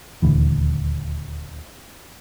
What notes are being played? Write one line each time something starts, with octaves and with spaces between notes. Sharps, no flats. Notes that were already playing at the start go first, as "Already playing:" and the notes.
D#1 D2 E3